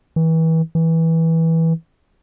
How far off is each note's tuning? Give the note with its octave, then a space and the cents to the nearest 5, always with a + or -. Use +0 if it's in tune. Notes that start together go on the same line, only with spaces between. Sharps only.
E3 -30
E3 -15